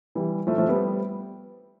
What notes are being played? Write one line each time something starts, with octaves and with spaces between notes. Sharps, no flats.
E3 G3
F3 A3
F3 A3
G3 B3